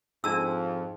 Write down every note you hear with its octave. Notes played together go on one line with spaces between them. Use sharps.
F2 G#2 D4 A5 E6